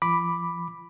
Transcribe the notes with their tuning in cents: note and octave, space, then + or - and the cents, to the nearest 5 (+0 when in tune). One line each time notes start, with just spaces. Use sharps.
F3 -40 B5 +0 D6 +0